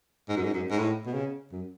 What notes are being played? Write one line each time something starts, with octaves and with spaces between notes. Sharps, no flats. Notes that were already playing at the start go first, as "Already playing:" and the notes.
G#2
F#2
G#2
F#2
G#2
A2
B2
C#3
F#2